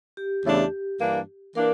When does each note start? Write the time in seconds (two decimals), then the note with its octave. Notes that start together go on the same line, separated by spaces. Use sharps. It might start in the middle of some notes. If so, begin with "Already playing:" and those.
0.17 G4
0.45 E2 C#3 E3 A3 D4
1.00 G2 E3 A#3 D4
1.55 E3 A#3 D4 A#4